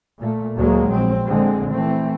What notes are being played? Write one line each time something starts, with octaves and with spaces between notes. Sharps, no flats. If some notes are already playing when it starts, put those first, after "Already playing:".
A#2 A3
D2 F#3 G#3 A#3
A#1 C4
A#2 D3 G#3 C4
E3 A3 C4